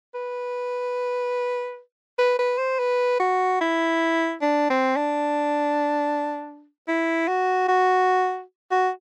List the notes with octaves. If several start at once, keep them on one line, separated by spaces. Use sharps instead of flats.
B4
B4
B4
C5
B4
F#4
E4
D4
C4
D4
E4
F#4
F#4
F#4